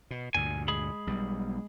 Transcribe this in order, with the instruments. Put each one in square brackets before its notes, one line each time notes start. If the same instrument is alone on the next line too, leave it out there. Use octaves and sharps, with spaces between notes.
[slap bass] B2
[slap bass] D2 G2 A#2 [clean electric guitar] G#5
[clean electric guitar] G#3 G#4 B5
[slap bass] B1 G3 B3